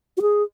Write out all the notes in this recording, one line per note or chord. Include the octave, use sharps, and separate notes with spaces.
F#4
G#4